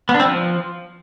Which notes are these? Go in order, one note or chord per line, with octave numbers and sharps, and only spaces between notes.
B3
D4
C4
F3